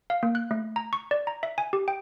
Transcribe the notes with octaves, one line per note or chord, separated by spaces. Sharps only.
F5
A#3
F#6
A3
A#5
C#6
D5
A#5
E5
G#5
G4
G5